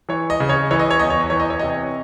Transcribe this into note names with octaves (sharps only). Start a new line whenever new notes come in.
E3 C#5
D#5
C#3
C#5
E3 C#5
D#5
C#5
E2 D#5
C#5
D#5
E3 C#5
D#5
C#5
C3 D#5
C#5